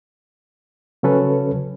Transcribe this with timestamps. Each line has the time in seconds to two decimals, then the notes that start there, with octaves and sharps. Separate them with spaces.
1.03 C#3 F#3 C#4 A4 B4